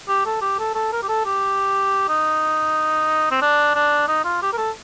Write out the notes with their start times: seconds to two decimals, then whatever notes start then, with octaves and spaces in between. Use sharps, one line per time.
0.08 G4
0.26 A4
0.41 G4
0.59 A4
0.75 A4
0.92 A#4
1.03 G4
1.08 A4
1.25 G4
2.09 D#4
3.31 C4
3.42 D4
3.75 D4
4.08 D#4
4.24 F4
4.42 G4
4.53 A#4
4.58 A4